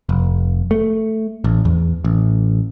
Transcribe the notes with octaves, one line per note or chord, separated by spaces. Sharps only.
F1
A3
A1
E2
A1